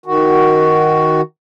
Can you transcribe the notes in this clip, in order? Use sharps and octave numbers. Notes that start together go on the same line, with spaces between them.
D#3 F#4